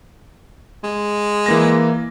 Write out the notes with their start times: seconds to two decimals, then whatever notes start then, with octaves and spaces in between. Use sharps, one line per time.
0.84 G#3
1.46 E3 A#3 A#6